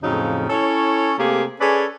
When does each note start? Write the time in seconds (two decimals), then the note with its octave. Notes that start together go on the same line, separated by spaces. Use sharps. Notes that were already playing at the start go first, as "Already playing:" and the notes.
0.02 F2 A2 C#3 F3 F#3 D#4
0.49 C#4 E4 A4 C#5
1.18 C3 A3 A#3 G4 G#4 A#4
1.61 C#4 G#4 A4 B4 C#5 D5